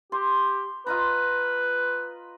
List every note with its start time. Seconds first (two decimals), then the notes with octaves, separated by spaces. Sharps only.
0.12 G4 C6
0.87 F4 B4 D#5 A#5